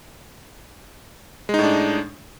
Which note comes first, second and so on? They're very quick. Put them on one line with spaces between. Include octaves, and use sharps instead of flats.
G#3 D#4 A2 D4